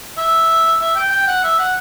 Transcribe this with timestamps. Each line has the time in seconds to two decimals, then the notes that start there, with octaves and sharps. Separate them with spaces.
0.18 E5
0.81 E5
0.96 G5
1.11 G5
1.27 F#5
1.44 E5
1.59 F#5